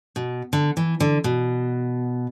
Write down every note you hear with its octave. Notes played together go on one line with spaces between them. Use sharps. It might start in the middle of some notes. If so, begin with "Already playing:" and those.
B2
D3
E3
D3
B2